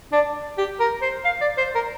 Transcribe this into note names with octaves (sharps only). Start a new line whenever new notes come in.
D4
G4
A#4
C5
F5
D5
C5
A#4